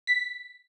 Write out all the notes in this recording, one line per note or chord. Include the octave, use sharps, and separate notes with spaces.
B6